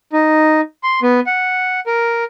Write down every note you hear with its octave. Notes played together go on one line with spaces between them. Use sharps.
D#4
C6
B3
F#5
A#4